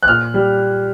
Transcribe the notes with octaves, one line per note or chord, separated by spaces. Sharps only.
F#6
A#2 F6
G3